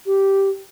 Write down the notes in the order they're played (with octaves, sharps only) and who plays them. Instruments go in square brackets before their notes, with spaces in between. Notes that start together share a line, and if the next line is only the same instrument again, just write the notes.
[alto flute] G4